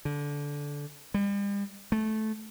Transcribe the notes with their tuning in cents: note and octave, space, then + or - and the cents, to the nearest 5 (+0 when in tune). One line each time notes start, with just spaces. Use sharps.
D3 -15
G3 +40
A3 -15